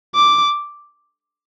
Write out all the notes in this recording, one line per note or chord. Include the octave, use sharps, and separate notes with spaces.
D6